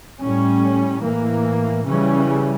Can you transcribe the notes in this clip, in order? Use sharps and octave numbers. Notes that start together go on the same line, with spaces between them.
A2 G3 C#4
A2 E3 A#3
C#3 E3 G3 C#4